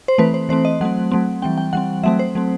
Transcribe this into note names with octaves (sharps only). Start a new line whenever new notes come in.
C5
E3 A3 C4 B4
C5
E3 A3 C4 C5
D#5
F#3 A3 C4 F#5
F#3 A3 C4
E3 G3 C4 G5
G5
E3 G3 C4 F#5
F#3 A3 C4 E5
C5
F#3 A3 C4